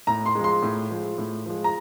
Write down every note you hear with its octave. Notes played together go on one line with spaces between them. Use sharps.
A2 A#5
C6
F3 G#3
C6
A2
F3 G#3
A2
F3 G#3
A#5